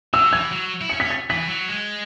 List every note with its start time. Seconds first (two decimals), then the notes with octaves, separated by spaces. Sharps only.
0.14 F#3 E6
0.32 E3 G#6
0.52 F#3
0.81 E4
0.89 C#4 C#7
1.00 C#4 B6
1.10 A6
1.30 E3 B6
1.49 F#3
1.68 G#3